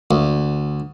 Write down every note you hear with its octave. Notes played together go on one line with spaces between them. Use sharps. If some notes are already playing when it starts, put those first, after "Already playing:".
D2